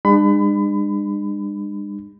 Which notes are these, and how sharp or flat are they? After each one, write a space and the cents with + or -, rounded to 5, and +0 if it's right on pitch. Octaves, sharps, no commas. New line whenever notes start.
G#3 -40 D4 +40 B5 +30